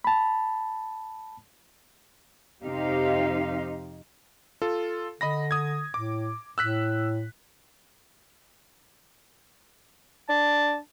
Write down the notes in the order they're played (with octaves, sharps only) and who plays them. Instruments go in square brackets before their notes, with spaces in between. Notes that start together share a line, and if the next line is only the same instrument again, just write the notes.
[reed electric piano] A5 B5
[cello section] F2 C3 D#4 G4 C5 F5
[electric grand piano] F4 A4
[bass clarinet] D3 [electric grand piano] D#5 B5 A#6
[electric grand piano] D#6 G#6
[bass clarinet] A2 [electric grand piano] D6
[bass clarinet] A2 [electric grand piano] E6 F#6 B6
[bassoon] D4 [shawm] A5